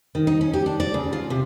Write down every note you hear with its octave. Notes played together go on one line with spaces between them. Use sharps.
D#3
D#4
C#4
G4
D4
D5
C#3
F4
C3